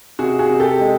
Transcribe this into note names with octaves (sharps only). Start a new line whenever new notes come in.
C3 F#4 G#4
F#4 G#4
C3
G4 A4
G#3